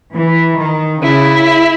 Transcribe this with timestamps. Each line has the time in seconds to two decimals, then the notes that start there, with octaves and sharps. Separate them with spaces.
0.15 E3
0.59 D#3
1.02 C#3 E4